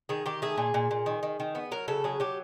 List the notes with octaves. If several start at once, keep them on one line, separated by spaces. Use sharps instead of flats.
D#3 G#4
D#3 G4
A3 G#4
A#2
A#2
A#2
D#3
D#3
D#3
B3
F#3 A#4
C#3 A4
F#3 G#4
F#3 G4